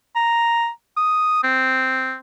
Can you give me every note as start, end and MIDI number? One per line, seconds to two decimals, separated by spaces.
0.16 0.69 82
0.97 1.39 87
1.43 2.16 60